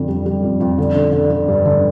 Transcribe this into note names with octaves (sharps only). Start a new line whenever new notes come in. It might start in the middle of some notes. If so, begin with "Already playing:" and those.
Already playing: F2 D3
G3
G3
F2
F2
D3
D3
D3
D3
G2
D3